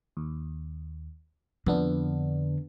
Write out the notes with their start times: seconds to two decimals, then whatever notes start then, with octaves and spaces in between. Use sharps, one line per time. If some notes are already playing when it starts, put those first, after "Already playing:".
0.17 D#2
1.66 F2 D3 B3 D4